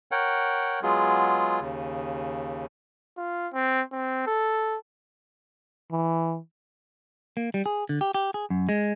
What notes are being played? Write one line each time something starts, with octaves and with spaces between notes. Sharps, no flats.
A#4 C#5 F#5 G5
F#3 G#3 B3 F4 G#4
D#2 C#3
F4
C4
C4
A4
E3
A#3
G3
G#4
D3
G4
G4
G#4
F#2
G#3